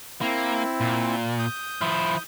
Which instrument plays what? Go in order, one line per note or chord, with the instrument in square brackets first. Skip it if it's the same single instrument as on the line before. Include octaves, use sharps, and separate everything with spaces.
[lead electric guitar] A#3 [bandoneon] C4 E4
[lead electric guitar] A#2
[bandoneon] D#6 G6
[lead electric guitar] F3 E4